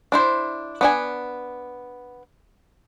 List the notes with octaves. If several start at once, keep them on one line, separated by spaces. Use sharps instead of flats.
D4 E4 C5
B3 D4 G#5